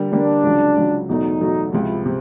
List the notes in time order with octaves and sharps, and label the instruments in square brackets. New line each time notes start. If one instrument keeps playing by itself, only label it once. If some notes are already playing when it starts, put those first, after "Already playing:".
Already playing: [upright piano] D3 G3 A#3
[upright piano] D3 G3 A#3 [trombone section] D4
[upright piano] C#2 C#3 F#3
C#2 C#3 F#3
[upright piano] E2 B2 F#3 A3 [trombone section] D#4
[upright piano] E2 B2 F#3 A3
[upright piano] C#2 C3 F3 [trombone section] E4
[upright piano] C3